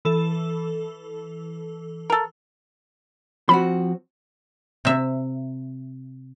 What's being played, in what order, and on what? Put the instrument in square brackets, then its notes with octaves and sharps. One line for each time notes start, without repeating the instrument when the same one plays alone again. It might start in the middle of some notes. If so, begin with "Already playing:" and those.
[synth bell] E3 A4
[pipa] A4 A#4
[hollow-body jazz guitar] F3 C4 F#4 [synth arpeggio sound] B5
[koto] C3 E5